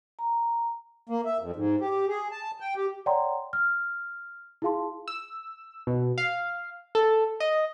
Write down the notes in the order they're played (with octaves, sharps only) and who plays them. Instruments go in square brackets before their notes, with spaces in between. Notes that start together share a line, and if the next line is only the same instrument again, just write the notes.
[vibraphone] A#5
[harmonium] A#3
E5
F2
G#2
G4
G#4
A5
G5
G4
[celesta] C#5 D5 F#5 G5 A#5 C6
F6
E4 F4 G#4 F5 A5 C6
[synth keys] E6
B2
F5
A4
D#5